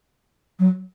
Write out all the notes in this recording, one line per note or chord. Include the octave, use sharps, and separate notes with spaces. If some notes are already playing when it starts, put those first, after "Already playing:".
F#3